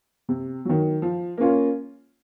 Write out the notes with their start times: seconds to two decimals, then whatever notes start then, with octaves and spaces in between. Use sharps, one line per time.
0.29 C3
0.65 D#3 F#3
1.02 F3
1.37 A#3 C#4 F4